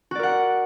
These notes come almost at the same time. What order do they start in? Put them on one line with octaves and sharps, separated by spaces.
F#4 D5 A#4 F#5